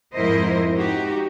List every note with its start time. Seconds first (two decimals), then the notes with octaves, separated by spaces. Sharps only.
0.14 F2 G#2 E4 A#4 C5 D#5
0.73 D#4 F#4 G4